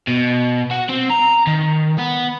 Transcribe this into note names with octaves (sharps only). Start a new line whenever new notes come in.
B2
F#4
C4
A#5
D#3
B3